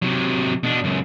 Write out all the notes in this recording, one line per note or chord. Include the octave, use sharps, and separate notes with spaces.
C3 F#3
B2 D4
C#2 F#2